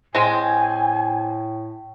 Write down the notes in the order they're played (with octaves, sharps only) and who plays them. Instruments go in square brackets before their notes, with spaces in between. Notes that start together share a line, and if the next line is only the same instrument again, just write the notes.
[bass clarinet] A2 [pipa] G#3 C4 [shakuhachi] G#5